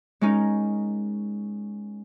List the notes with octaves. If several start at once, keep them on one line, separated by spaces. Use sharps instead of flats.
G#3 C#4 D#4 A#4